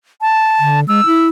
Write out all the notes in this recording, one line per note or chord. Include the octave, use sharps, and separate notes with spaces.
A5
D3
G#3 E6
E4